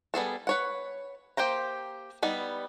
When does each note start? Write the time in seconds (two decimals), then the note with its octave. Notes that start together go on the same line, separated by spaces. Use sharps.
0.14 G3 B3 G#4 A4
0.47 B4 C#5 F#5
1.37 A#3 G4 C5 G5 A#5
2.23 G3 B3 D#4